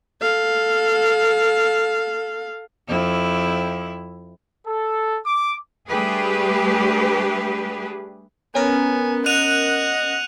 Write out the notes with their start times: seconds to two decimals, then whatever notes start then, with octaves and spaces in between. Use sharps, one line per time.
0.22 A4 F5
2.88 F2 E4
4.66 A4
5.25 D6
5.88 G3 A3 D4 G4 G#4 B4
8.55 B3 C#4 A#4 G#5
9.26 D#5 F#5 F#6 D#7 F7